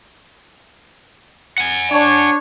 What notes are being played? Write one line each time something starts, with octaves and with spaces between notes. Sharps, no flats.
F#5 G#5
D4 C#5